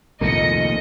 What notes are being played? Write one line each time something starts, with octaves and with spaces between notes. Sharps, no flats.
C2 F2 A#2 D#3 A3 A#3 D#5 C#7